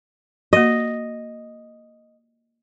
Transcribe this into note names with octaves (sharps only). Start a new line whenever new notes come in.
A#3 F#4 D#5